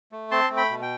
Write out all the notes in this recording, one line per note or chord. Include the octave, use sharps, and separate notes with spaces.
A3
C4 A5 C6
A3
G5 B5
B2
G5